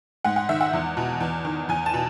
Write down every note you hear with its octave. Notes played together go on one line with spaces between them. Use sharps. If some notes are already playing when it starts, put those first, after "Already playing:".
G#2 F#5
F#5
D#3 E5
F#5
E2
B2
E2
D#3
E2 G#5
A5
B2